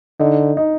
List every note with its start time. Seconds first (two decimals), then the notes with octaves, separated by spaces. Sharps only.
0.19 D3 D#4
0.57 D#4